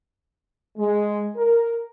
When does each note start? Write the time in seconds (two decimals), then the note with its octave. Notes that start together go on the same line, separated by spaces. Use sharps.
0.78 G#3
1.37 A#4